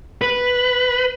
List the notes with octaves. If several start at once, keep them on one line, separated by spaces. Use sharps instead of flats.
B4